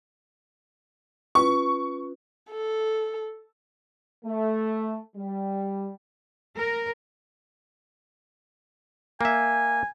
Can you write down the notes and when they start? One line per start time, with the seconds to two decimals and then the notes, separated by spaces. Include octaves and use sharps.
1.35 C#4 F4 B4 C#6
2.51 A4
4.26 A3
5.16 G3
6.56 A#4
9.21 A#3 E5 G#5